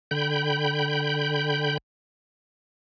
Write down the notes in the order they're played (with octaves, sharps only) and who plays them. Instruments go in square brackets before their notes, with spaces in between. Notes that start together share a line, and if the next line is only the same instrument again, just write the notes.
[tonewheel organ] D3 G5 B5 G6